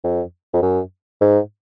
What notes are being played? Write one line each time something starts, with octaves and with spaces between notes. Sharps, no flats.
F2
F2
F#2
G#2